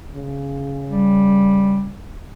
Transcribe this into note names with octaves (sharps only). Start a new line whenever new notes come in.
C#3
G3